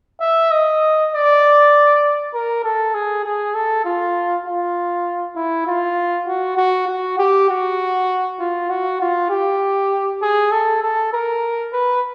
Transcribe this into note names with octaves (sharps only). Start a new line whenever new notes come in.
E5
D#5
D5
A#4
A4
G#4
G#4
A4
F4
F4
E4
F4
F#4
F#4
F#4
G4
F#4
F4
F#4
F4
G4
G#4
A4
A4
A#4
B4